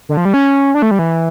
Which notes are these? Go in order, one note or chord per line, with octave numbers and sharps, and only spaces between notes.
D3
F3
G3
C#4
D4
A3
G3
E3